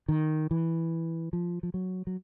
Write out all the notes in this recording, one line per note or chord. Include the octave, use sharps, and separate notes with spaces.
D#3
E3
F3
F3
F#3
F#3